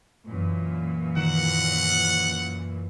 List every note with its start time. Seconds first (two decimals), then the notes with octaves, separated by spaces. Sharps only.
0.26 F#2 A#2 E3
1.17 D#3 F#5